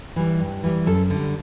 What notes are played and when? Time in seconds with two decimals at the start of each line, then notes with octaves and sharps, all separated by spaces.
0.16 E3 G3
0.40 G2
0.63 E3 G3
0.86 F#2 A4
1.10 D3 G3